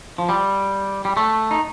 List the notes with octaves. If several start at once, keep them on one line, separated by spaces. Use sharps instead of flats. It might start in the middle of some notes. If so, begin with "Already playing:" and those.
F3
G3
G3
A3
D#4